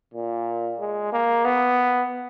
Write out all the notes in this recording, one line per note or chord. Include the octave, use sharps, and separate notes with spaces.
A#2
G#3
A#3
B3